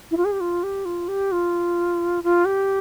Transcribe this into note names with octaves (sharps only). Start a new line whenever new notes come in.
E4
F4
G#4
G4
F4
G4
F4
G4
F4
F4
G4